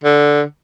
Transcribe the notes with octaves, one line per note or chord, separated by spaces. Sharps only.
D3